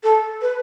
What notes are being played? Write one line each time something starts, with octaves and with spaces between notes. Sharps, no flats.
A4
B4